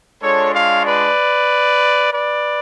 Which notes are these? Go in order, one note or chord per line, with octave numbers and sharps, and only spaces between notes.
G#3 D4 F4 A4 C#5
C#5 F5
B4 D5
B4 D5